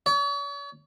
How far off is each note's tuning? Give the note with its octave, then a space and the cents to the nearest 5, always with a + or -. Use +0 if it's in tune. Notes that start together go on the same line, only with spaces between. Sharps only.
C#5 +45